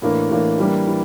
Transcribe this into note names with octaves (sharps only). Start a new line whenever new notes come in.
A2 E3 A#3 D4
A2 E3 A#3 D4
E3 G3 A#3 D4
E3